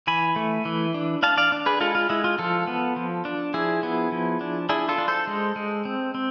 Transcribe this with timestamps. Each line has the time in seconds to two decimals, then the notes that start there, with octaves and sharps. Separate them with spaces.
0.07 E3 G#5 B5
0.36 A3
0.65 E3
0.94 D4
1.23 D4 F5 A5
1.37 D5 F5
1.52 D4
1.66 G#4 B4
1.81 G#3 F4 A4
1.95 F4
2.10 G#3 E4
2.24 F4
2.38 F3 F4 A4
2.67 B3
2.96 F3
3.25 D4
3.54 F3 E4 G#4
3.83 B3
4.12 F3
4.41 D4
4.69 D4 E4 G#4
4.89 F4 A4
4.98 D4
5.08 A4 C5
5.27 G#3
5.56 G#3
5.85 C4
6.15 C4